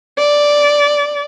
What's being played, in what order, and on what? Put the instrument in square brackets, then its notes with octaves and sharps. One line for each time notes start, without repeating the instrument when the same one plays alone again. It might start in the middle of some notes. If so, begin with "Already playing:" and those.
[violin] D5